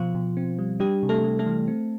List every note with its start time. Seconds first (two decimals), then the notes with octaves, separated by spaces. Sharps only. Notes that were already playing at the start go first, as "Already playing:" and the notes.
Already playing: B2 F3 F4
0.15 B2
0.37 C4
0.59 G3
0.80 G3 D4 G4
1.03 C3
1.09 A3 A4
1.24 G3
1.39 A3 A4
1.46 E3
1.68 C4